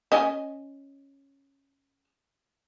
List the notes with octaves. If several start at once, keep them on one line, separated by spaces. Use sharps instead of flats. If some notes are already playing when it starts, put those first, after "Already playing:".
C#4 D#5 G#5